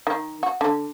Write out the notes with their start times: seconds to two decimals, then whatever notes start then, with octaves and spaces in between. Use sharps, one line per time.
0.07 D#3
0.43 F#4
0.61 D3